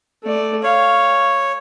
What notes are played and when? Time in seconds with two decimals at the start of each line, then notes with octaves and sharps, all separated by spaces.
0.24 A3 D5
0.63 C#5 F5